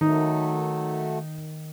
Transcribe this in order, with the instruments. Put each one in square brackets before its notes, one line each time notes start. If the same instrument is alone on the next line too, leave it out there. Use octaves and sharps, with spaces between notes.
[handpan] D#3 [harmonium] F#3 A3 [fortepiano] D#4